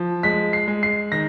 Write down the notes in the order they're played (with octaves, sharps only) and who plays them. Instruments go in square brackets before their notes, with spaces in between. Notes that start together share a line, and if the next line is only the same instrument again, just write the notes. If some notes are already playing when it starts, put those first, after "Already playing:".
Already playing: [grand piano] F3
G#3 B6
C7
G#3
C7
D#3 A#6